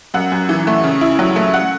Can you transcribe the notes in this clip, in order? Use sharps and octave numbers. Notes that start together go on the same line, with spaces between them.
F#2 F#5
F#2
E3
A3
C#3
E4
F#3
A3
F#5